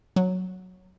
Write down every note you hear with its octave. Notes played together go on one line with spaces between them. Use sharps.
F#3